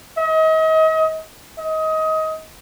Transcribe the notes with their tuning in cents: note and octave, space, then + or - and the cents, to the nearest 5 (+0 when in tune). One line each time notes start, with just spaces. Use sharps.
D#5 +35
D#5 +25